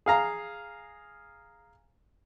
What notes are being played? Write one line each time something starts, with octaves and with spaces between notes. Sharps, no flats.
G#4 F5 A#5